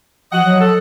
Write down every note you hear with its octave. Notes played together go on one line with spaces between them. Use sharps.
F3 D#5 F#5
F#3
A4